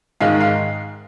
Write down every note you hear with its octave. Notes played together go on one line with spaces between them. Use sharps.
G#2 D#3 G#3 D#4 F5
F5